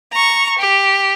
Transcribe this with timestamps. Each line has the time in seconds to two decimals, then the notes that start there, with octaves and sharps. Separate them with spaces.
0.13 A#5 C#6
0.59 G4